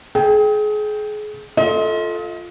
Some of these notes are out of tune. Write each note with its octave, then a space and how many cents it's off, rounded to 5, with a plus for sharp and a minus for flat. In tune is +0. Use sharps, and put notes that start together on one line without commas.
G#4 +30 G5 +0
F4 +5 A4 +0 D#5 +35